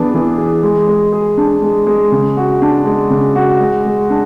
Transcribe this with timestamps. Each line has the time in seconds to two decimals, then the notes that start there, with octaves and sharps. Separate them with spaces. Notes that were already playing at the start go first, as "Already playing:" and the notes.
Already playing: E3 B3 D4 G#4
0.14 E3
0.38 G#4
0.63 G#3
0.88 G#3
1.12 G#4
1.37 D4
1.62 G#3
1.87 G#3
2.12 C#3
2.37 F#4
2.62 D4
2.85 G#3
3.10 C#3
3.36 F#4
3.60 G#3
3.85 G#3
4.10 D4